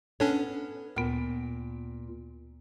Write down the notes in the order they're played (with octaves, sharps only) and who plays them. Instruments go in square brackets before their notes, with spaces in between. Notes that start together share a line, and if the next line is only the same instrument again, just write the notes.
[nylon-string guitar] B3 A4 [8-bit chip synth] C#4 D4 C#5
[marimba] D2 B3 [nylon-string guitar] A#2